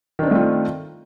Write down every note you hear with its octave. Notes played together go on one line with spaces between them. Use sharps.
D#3 A3 C4 D4 F4